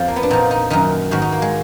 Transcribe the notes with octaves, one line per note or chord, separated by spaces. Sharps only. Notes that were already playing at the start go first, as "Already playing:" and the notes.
Already playing: F2 F3
A#3
B3
D4
A#2 F3 D#4
D#4
F#2 D#3 D#4
G#2 D#3 F#4
D#4
A#3
G#3